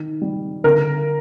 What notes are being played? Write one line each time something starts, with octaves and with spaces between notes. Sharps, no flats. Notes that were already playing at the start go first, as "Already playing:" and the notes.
Already playing: D#3
G3
D3 A#4